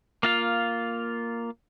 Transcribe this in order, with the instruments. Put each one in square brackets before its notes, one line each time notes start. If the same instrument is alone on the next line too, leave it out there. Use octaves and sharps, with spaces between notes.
[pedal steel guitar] A#3 F4 F5